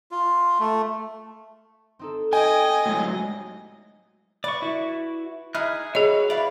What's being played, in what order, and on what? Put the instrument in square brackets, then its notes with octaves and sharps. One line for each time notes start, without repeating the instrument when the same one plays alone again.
[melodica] F4
A3
[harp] C4 D#4 A4
[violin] D#5 [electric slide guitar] G5 [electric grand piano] G#5
[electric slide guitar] A2 F#3 G#3
[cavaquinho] B4 [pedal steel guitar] D5 C#6
[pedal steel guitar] E4 F#4
[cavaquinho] D#4 E4 [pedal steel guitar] G#4 F6 F#6
[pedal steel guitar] F#4 C#5 [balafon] G#4 D#5 [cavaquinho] B4
[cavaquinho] E4 B4 [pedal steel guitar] D5 F5